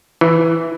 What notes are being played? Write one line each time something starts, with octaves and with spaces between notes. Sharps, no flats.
E3